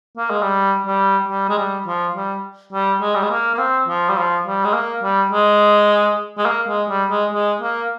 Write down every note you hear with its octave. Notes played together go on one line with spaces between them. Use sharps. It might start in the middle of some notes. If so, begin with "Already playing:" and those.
A#3
G#3
G3
G3
G3
G#3
G3
F3
G3
G3
G#3
G3
G#3
A#3
A#3
C4
F3
G3
F3
G3
G#3
A#3
G3
G#3
G#3
A#3
G#3
G3
G#3
G#3
A#3